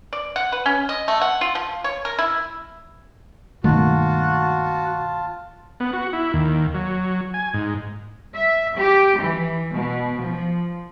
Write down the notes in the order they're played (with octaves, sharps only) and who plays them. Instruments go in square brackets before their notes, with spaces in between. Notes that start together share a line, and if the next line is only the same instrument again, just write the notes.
[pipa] D5
F#5
B4
C#4
D#5
A3
F#5
F4
F3
C#5
A#4
E4
[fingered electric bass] G2 D#3 A3 [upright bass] B2 A#3 [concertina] F4 A5 [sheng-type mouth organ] F#4
[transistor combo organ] B3
F#4
E4
D#2
F#3
G#5
G#2
[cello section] E5
G4
E3
B2
F3